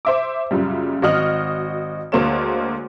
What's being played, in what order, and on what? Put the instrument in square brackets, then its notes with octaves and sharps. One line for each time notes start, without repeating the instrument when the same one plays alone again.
[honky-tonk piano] C5 E5 D6
F#2 A#2 C#3 G3
G#1 F#4 D#5 F6 F#7
D2 G#3 A#3 C5 C#5 E7